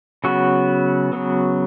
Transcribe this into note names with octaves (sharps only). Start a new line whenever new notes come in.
C#3 F#3 B3 F#4
C#3 F#3 B3